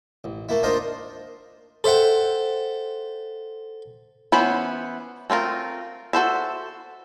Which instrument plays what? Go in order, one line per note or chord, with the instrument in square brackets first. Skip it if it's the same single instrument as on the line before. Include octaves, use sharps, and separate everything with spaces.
[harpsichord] A1
A3 A#3 E4
D4 D#4 F4 A#4 C5 A#5
A4 C5 E5 F#5 G5
[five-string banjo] E3 B3 C#4 C5 B5
A3 C4 F4 A#4
F#4 A4 C5 E5